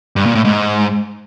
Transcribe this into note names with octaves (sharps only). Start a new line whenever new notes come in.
G2
A#2
A2
G#2